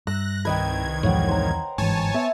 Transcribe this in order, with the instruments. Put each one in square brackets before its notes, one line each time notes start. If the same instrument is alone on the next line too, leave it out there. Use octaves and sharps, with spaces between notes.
[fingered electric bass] G2 [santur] E6 [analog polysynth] F#6 A#6
[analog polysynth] C2 D#3 G#6 [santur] B4 D#5 G5
[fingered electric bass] E2 [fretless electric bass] G#2 F3 [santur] C#5 F#5 G5
[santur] C5 A#5
[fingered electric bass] G1 E3 [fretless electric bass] G#2 [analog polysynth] C#5 G#5 A5
[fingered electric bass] B3 [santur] E5